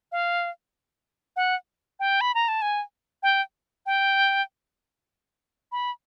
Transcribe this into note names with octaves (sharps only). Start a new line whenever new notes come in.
F5
F#5
G5
B5
A#5
A5
G#5
G5
G5
B5